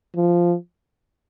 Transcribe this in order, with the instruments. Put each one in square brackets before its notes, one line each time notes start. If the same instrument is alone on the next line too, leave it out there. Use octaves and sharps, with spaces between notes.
[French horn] F3